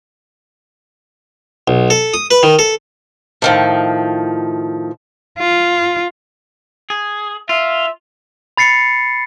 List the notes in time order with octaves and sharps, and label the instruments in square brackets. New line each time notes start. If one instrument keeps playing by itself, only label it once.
[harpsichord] B1
A4
D#6
B4
D#3
A4
[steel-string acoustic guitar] A2 D#3 F3
[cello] F4
[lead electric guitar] G#4
[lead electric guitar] F4 [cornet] E5
[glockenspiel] B5 A6 C7 C#7